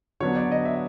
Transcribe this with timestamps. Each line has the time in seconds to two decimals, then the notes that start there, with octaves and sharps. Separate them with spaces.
0.20 D3 F#3 B3 D4 C#5
0.36 D5
0.51 D#5
0.65 E5